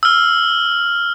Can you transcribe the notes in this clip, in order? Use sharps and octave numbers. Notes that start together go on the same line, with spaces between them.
E6 F6